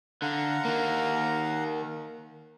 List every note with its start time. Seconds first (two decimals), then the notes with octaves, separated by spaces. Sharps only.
0.22 D3 F5 F#5 A#5
0.65 D#3 A#3